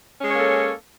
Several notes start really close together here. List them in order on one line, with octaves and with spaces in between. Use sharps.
C#4 G#3 C#5 A#3 A4